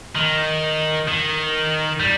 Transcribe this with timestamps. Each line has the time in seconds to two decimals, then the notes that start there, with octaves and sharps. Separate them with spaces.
0.16 D#3
1.08 D#3
2.00 G3